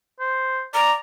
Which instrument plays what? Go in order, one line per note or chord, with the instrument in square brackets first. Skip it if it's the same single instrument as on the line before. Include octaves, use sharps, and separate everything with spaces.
[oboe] C5
[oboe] D5 [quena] A#5